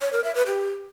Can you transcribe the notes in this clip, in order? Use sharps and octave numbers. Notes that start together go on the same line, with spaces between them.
C#5
A#4
E5
B4
G4